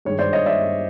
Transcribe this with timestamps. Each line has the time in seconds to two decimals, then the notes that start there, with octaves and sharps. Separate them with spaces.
0.05 G2 D#3 G#3 C#5
0.19 C5 D5
0.33 C#5 D#5
0.46 D5 E5